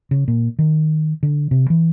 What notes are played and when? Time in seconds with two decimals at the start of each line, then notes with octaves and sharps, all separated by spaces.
0.11 C#3
0.28 A#2
0.59 D#3
1.23 D3
1.51 C3
1.70 E3